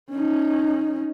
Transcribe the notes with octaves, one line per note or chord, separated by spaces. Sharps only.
C#4 D#4